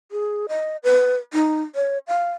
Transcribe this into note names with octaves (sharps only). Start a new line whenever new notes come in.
G#4
D#5
B4
D#4
C#5
F5